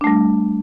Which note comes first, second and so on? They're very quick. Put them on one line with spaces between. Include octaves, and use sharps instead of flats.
D4 A3 G3